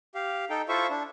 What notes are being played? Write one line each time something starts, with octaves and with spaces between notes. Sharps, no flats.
G4 F5
D#4 A4 G5
E4 F4 A4 C5 E5 C#6
D4